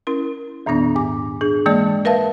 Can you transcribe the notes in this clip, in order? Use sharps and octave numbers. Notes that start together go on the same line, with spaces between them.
C#4 E4 A#4
E2 A#2 D#3 B3 D4
G#2 D6
D4 G#4
E3 G#3 A#3 D5
A#4 B4 E5 F5 A5